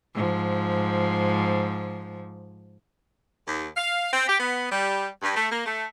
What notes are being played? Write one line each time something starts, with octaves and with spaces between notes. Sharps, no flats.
G#2 F3
D#2
F5
C4
G4
B3
G3
G2
A3
A#3
A3